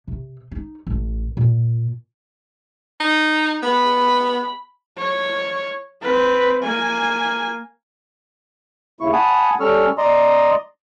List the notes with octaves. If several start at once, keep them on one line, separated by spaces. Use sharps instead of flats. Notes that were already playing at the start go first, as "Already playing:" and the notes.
C3
D#4
A1
A#2
D#4
B3 B5
C#5
C4 B4
A#3 G#5
D#2 C#3 E4 C#6
F#5 G#5 A5 B5 D#6
G3 C#4 A4 C#6 E6 F6
D5 D#5 A#5 C6 D#6